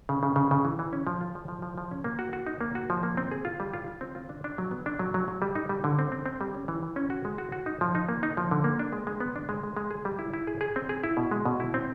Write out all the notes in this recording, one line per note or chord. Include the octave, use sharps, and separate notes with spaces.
C#3
C#3
C#3
C#3
E3
E3
C#4
F3
F4
F3
F3
F3
F3
C#4
A#3
F#4
F#4
D#4
A#3
F#4
F3
A#3
C4
G#4
F4
G3
F4
F4
C4
F4
D4
D4
F#3
B3
D4
F#3
F#3
F#3
G3
D#4
G3
D3
C4
C4
C4
G3
C#4
E3
E3
C#4
F#4
G#3
F#4
F#4
D#4
F3
D#4
A#3
D#4
F3
D3
A#3
D4
G#3
G#3
B3
D4
G#3
G#3
G#3
G#4
G3
E4
E4
G#4
G#4
C4
G#4
E4
B2
G#3
B2
E4
C4